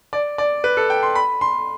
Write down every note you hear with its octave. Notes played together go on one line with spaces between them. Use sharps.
D5
D5
B4
A4
G5
C6
B5
C6